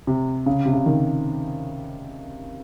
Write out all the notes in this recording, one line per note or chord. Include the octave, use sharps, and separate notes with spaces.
C3
C#3
C3
C#3
D#3